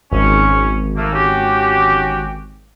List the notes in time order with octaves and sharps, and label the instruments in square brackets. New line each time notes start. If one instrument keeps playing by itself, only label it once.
[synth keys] G#1 [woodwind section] C#4
[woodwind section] A3 A#3
C#4 F#4 G4